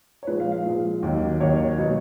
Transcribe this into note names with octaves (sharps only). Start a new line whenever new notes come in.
C#5
A#2 F3 G#3 B4
F5
F5
A#2 F3 G#3
D#2 D#3 F#3 A#3
D#2 D#3 F#3 A#3 C#5
B2 F#3 A#3 D#4